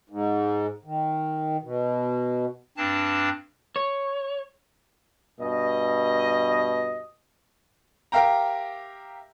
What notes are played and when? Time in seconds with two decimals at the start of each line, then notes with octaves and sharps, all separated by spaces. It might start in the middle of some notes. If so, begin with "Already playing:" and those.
0.10 G#2
0.85 D#3
1.62 B2
2.77 G2 C4 D4 A5
3.76 C#5
5.40 G2 B2 D#5
8.12 G4 A#4 E5 F5 G5 A#5